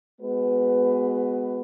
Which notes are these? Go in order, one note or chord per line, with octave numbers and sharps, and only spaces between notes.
G#3 B3 F#4 B4